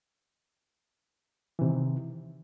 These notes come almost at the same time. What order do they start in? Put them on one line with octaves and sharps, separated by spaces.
E3 C3 D#3